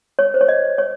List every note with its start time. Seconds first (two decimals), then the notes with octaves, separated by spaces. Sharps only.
0.19 C#5
0.34 C5
0.41 C#5
0.48 D#5
0.78 C#5